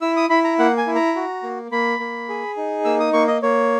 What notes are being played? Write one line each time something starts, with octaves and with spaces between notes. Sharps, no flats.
E4 E6
D#6
E4 B5
A#5
A#3 F#5
G#5
E4
A#5
F#4
A#3
A#3 B5
A#3
G#4
D#4
A#3 E6
D#6
A#3 C#6
D#5
A#3 C#5